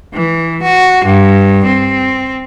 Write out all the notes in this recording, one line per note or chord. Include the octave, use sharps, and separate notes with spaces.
E3
F#4
G2
C4